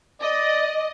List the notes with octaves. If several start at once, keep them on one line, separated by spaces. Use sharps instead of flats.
D5 D#5